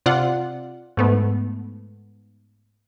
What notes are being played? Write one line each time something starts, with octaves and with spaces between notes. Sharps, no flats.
C3 F4 D5 F#5
G#2 A3 B3